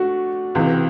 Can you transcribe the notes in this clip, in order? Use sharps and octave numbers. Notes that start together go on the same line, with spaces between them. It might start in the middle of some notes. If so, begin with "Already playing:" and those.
Already playing: A3 D4 F#4
C#2 C3 E3